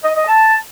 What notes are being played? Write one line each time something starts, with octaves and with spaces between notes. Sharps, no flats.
D#5
D#5
A5